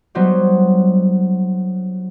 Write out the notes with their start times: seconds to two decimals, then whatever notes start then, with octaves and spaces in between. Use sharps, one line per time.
0.15 F#3 G3 B3 D#4 F#4 C5